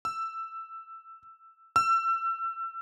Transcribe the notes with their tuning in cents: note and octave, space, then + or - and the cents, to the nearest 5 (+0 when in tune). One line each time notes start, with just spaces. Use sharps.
E6 +10
E6 +30